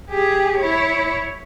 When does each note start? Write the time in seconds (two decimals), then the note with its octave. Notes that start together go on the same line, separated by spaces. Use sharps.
0.10 G4 G#4
0.58 E4 C#5